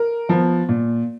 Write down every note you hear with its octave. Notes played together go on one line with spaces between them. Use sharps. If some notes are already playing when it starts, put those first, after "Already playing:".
Already playing: A#4
F3 B3
A#2